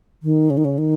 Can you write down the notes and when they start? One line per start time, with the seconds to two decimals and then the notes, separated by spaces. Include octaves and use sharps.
0.23 D#3
0.50 C#3
0.57 D#3
0.65 C#3
0.78 D#3